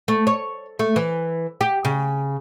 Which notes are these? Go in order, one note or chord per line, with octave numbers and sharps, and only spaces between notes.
A3
C#5
A3
E3
G4
C#3